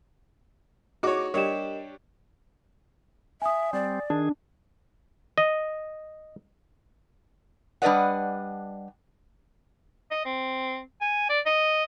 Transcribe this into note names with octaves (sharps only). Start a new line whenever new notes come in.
D#4 F#4 G#4 C#5 D6
G3 D4 G4 A#4 C#5 D#5 E7
E5 G#5 D#6
G3 C4 D5
D#3 D4 G#4
D#5
G3 D4 B4 D5 D#5 F#5
D#5
C4
G#5
D5
D#5